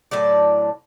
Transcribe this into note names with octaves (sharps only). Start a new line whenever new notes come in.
A2 D3 F#3 D5